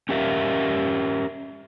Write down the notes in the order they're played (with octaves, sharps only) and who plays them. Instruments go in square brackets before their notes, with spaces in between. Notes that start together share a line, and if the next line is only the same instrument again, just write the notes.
[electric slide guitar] C#4 G4 A#4 E5 F5